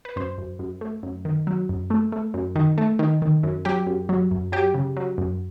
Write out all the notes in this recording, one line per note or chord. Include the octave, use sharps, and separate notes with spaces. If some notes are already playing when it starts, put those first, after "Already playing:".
B4
F#2 C5
F#2
F#2
A3
F#2
D#3
F#3
F#2
A3
A3
F#2
D#3
A3
D#3
D#3
F#2
F#3 G4
F#2
F#3
F#2
F#3 G4
C#3
F#3
F#2